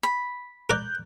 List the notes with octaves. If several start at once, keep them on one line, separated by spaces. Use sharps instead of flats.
B5
A#4 D5 F#6 G6